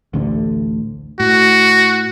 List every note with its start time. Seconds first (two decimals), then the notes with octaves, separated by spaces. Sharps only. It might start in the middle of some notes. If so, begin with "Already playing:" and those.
0.13 A1 D2 D3
1.20 A2 F#4